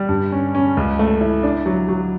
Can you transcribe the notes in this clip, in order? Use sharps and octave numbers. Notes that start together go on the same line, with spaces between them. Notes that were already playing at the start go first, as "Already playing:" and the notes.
Already playing: G3
G2
C#4
C#4
C#2
A3
E4
D4
F#3
F#3